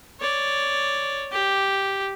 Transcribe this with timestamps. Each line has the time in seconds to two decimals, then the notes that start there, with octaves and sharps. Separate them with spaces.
0.20 C#5 D5
1.32 G4